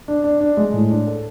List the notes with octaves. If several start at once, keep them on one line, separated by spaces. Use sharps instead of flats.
D4
D4
D4
G#3
A2
D4
A4